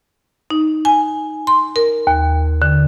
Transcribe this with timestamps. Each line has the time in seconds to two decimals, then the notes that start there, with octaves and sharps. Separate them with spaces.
0.50 D#4
0.85 G#5
1.47 C6
1.76 A#4
2.07 D#2
2.62 D3